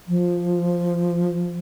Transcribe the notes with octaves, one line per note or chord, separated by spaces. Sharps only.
F3